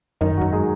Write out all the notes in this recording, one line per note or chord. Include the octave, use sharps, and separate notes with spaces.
F#2 D#3 D#4
F#2 F#3 F#4
G#3 G#4